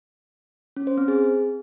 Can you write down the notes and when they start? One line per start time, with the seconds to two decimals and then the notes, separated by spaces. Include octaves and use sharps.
0.77 C#4
0.87 C5
0.98 C4
1.08 G#4